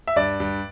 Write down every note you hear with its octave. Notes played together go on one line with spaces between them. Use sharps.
E5
G2 D5
G2